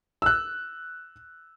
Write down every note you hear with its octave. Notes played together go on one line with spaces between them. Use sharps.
E6 F#6